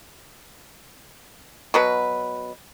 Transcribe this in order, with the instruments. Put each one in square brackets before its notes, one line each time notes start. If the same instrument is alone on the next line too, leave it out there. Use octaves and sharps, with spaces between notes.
[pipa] B2 F#3 B4